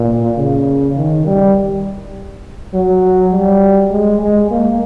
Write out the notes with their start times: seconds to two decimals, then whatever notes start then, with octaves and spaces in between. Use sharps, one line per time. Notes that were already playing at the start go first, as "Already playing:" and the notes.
Already playing: A#2
0.38 C#3
0.97 D#3
1.27 G3
2.74 F#3
3.33 G3
3.92 G#3
4.21 G#3
4.51 A#3